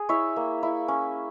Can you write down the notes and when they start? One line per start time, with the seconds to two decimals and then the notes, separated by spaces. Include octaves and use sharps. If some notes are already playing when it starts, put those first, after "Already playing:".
Already playing: G#4
0.09 E4 C#5 E5
0.36 A#3
0.63 E4
0.88 C#4